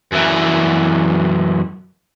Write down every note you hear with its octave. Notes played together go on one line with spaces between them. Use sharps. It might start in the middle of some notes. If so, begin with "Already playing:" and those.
F#2 E3